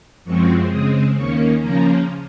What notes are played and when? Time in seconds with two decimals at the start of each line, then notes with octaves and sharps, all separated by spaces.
0.24 F#2 F3 G#3 C4 C#6
0.70 C#3 G#3 C4 D#6
1.15 D#2 D#3 A#3 C#4 C#6
1.61 C#3 F3 A#3 C#4 A#5